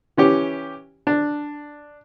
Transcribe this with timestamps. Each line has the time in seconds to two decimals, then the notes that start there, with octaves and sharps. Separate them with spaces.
0.17 E3 C#4 G4
1.07 D4